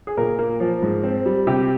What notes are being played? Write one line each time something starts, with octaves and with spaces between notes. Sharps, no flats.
G#4
A#2 A#4
A#3
F3
G#2
C4
G3
C3 G4